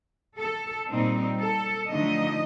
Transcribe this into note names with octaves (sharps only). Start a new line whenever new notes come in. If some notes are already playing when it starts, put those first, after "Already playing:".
A4
A#2 G3 C4 D#4
A4
D3 F3 A3 D#4 D#5